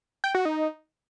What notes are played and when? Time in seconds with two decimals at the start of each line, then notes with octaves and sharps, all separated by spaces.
0.24 G5
0.35 F#4
0.45 D#4